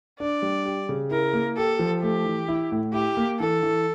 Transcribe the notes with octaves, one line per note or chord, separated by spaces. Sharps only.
D4 D5
G3
G4
C#3
E4 A#4
A#3
G4 A4
F3
A3 G4
E3
E4
A2
E4 G4
A#3
E3 A4
E3